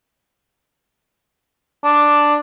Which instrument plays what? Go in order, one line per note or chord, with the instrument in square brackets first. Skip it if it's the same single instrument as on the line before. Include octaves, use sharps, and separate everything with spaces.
[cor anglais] D4